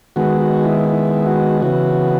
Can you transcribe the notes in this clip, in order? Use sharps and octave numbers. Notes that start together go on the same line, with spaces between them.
D#3 G#3 B3 F#4
F#4
E4
E4
F#4
C#3 E3 B3 F#4